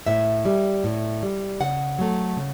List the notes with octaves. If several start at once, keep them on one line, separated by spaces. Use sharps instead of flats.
A2 E5
G3
A2
G3
C#3 F#5
F#3 A3
C#3